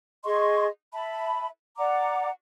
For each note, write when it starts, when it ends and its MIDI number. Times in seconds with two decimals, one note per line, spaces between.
0.25 0.67 68
0.25 0.67 75
0.25 0.67 84
0.25 0.67 85
0.93 1.48 76
0.93 1.48 81
0.93 1.48 83
1.77 2.29 74
1.77 2.29 78
1.77 2.29 82
1.77 2.29 86